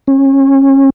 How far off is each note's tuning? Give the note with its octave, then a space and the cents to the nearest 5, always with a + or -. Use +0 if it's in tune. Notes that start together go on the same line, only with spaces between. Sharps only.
C#4 -30